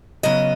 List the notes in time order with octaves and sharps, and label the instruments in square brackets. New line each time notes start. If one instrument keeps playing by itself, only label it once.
[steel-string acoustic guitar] C#3 F#3 B3 D#5